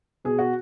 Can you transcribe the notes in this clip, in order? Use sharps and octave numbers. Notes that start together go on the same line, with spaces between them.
B2 G#4
F#4